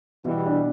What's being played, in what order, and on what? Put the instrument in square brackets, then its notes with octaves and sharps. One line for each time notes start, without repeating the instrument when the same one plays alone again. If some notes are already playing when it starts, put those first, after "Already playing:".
[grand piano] B2 [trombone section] E3 G3
[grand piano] D4